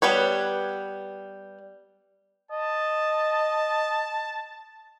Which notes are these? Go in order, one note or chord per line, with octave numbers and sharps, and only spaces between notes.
G3 B3 B4 C#5
D#5 A5